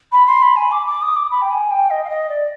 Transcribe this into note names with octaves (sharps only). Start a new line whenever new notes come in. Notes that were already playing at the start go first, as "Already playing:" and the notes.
B5
C6
B5
G#5
D6
D6
D#6
D6
B5
G5
G#5
G5
D#5
F5
D#5
D5